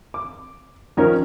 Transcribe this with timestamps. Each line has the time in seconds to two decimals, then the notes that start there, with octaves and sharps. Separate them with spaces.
0.14 D6
0.97 D#3 F3 C#4 A#4 C#5